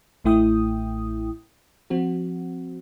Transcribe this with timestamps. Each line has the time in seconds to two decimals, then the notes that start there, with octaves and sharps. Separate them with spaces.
0.24 A1 A2 A3 E4 G5 D#6
1.90 F3 C4 F#4